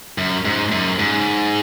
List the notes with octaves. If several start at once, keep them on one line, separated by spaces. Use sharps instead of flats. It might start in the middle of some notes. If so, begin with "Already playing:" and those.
F#2
G#2
F#2
G#2